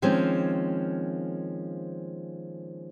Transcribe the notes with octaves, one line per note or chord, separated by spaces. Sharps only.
D#3 F3 G#3 A#3 C4 C#4